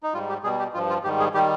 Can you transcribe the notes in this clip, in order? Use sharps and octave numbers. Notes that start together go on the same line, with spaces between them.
D#4
G#2 G3 F4
G4
B2 G3 G#4
G4
G2 F3 F4
F4
G#2 D#3 G3 G4
G#4
D#3 G3 G4